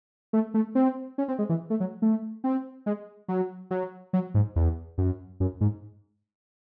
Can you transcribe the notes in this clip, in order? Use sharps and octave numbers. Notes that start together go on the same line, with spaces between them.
A3
A3
C4
C#4
C4
G#3
E3
A3
F#3
A3
C4
G#3
F#3
F#3
F#3
G#2
E2
F#2
F#2
G#2